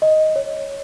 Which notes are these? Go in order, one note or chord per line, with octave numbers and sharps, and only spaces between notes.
D#5
C#5